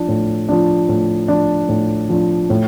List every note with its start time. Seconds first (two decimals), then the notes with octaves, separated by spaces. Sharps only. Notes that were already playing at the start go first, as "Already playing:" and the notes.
Already playing: F3 D4
0.08 A2
0.49 F3 D4
0.89 A2
1.28 F3 D4
1.69 A2
2.10 F3 D4
2.50 A2